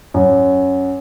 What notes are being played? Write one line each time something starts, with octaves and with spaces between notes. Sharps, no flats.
F#2